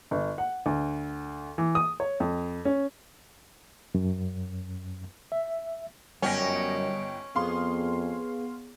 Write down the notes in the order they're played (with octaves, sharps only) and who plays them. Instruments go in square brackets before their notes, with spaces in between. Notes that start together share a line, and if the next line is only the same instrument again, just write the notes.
[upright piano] G1
F#5
D2
E3
D#6
C#5
F2
C#4
[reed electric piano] F#2
E5
[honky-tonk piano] G1 G5 A#6 [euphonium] F#2 [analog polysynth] G3 D#5 D7 [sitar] C#4
[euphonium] F2 [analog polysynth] B3 G#4 [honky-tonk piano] F5 C6